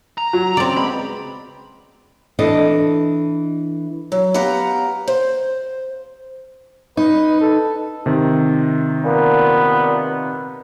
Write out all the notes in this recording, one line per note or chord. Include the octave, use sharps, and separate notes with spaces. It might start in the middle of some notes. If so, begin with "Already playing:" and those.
A#5
F#3
C#3 C4 D5
G#3 B3 B5
E3 D4 A4 D#5
F#3
B3 G4 F5 F#5 A#5
C5
D#4 B4
A4
C3 D#3
A#2 B3